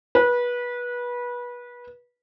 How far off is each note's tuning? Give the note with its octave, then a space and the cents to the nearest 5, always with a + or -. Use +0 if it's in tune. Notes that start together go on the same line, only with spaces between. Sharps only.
B4 -25